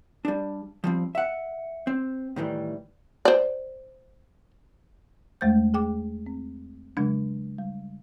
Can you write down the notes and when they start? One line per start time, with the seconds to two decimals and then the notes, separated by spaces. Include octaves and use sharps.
0.25 G3 D4
0.84 F3 G3 C4
1.15 E5 F#5
1.87 C4
2.36 A2 D#3 E3 G3
3.25 C5 D5
5.41 E2 G#3 A3 C5 G6
5.74 G#4 G5 D6
6.26 C4
6.97 C#3 F#3 G#3 D4
7.58 G3